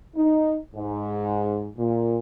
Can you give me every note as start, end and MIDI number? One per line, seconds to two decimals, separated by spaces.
0.16 0.57 63
0.75 1.67 44
1.77 2.19 46